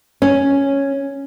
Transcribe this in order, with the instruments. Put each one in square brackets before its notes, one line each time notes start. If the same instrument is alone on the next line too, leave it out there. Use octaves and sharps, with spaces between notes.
[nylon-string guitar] C#4